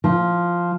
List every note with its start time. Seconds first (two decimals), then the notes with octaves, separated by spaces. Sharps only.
0.04 F3